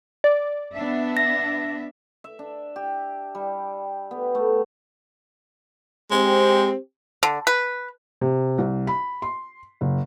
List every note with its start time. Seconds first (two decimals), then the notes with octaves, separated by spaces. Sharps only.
0.24 D5
0.72 B3 D4 E5
1.17 A#6
2.24 E5
2.39 D4
2.76 G4
3.35 G3
4.11 B3
4.35 A3
6.11 G#3 C4 G4
7.23 D3
7.47 B4
8.21 C3
8.58 C2
8.87 B5
9.22 C6
9.81 F#1